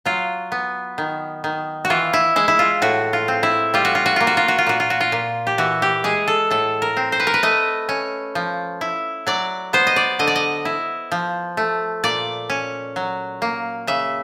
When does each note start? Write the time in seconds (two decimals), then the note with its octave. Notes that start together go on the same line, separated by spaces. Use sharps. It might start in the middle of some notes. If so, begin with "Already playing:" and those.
0.05 F#3 F4
0.52 B3
0.98 D#3
1.44 D#3
1.85 F#4
1.90 E3 F4
2.13 E4
2.36 G#3 E4
2.48 E4
2.59 F4
2.82 A2 F#4
3.13 F4
3.28 C4
3.43 E4
3.74 G3 F4
3.85 F#4
3.95 F4
4.06 F#4
4.16 A#3 F4
4.27 F#4
4.37 F4
4.48 F#4
4.58 F4
4.67 A#2 F#4
4.80 F4
4.90 F#4
5.01 F4
5.12 A#2
5.47 G4
5.58 E3 F#4
5.82 G4
6.04 G#3 G#4
6.28 A4
6.51 A2 A4
6.82 A#4
6.97 C4
7.12 C5
7.20 B4
7.27 A#4
7.34 B4
7.43 A3 D#5
7.89 C#4
8.35 F3
8.81 E4
9.27 F#3 D5
9.73 B3 C5
9.87 D#5
9.96 D5
10.19 D3 D#5
10.27 D5
10.36 D#5
10.65 E4
11.12 F3
11.57 A3
12.04 A#2 D5
12.50 C#4
12.96 F#3
13.42 A#3
13.87 C#3 E5